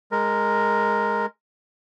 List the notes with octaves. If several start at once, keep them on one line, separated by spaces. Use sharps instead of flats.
G#3 A#4